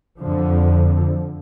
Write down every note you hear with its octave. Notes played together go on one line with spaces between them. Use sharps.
F2 D3 F3